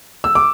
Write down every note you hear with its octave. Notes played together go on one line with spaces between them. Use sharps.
E6
D6